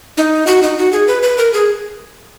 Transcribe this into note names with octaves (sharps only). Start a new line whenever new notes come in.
D#4
F#4
D#4
F#4
G#4
B4
B4
A#4
G#4